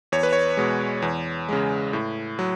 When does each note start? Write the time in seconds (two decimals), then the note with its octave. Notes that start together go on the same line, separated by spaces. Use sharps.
0.12 E2 C#5
0.23 B4
0.33 C#5
0.57 B2 G#3
1.02 E2
1.49 C#3 G#3
1.93 A2
2.39 F#3